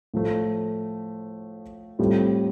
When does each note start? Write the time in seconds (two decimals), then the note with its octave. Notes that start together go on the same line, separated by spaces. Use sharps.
0.14 A2 F3 A3
1.99 A2 G3 C4 F4